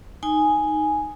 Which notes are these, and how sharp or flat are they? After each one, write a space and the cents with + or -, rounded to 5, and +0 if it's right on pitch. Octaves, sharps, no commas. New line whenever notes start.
D#4 +0 G#5 +0